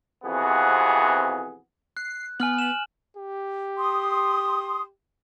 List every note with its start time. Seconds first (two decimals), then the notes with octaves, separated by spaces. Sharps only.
0.24 F2 C3 E3 B3 F#4 G#4
1.97 F#6 C7
2.40 B3 G#5 F6 F#7
2.58 E7 F#7
3.16 G4
3.77 C6 D#6